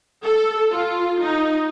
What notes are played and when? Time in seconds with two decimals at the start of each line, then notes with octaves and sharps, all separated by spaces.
0.24 A4
0.72 F4
1.22 D#4